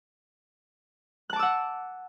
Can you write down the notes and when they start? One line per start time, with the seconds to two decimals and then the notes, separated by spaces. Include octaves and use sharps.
1.30 F#6
1.33 A5
1.36 D6
1.39 E6
1.43 F#5